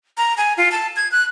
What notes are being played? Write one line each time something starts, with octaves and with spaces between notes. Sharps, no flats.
A#5
G#5
F4
A5
G#6
F#6